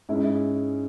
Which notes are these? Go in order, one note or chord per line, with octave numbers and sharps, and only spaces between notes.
G#2 G#3 C#4 E4